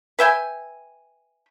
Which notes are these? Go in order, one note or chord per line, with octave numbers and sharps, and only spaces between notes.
B4 E5 G5 G#5